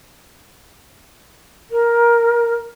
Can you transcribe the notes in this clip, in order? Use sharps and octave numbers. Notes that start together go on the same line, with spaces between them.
A#4